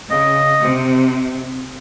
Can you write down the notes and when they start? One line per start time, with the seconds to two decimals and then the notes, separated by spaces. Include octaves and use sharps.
0.11 C#3 D#5
0.62 C3